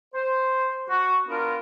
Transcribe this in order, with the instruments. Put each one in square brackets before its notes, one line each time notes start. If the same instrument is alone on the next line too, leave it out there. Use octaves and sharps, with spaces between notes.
[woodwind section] C5
F#4
B3 D4 F4 A#4